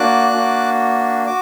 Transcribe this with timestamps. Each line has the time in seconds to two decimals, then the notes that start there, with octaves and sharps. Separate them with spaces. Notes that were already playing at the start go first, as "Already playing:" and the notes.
Already playing: A#3 D4 F#4 D6 F#6
0.32 A#3 D4 F#4
1.27 F#4 D6